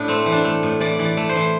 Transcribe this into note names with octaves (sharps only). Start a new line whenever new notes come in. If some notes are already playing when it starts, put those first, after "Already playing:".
Already playing: A2 D4 E4
A3 C4
E3
D4
A3
A2
E3 D5
E3
D5
A3
C5
E3